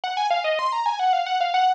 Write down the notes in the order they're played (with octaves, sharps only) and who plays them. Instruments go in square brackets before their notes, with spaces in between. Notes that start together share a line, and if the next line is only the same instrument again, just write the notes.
[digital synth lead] F#5
G#5
F5
D#5
C6
A#5
G#5
F#5
F5
F#5
F5
F#5